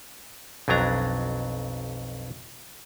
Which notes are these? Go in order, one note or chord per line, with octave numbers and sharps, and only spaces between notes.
B1 F2 F#3 D4 A#5